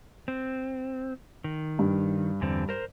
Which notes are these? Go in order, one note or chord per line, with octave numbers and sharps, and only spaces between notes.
C4
D#3
G2
E2 D3 C4
A#4 C5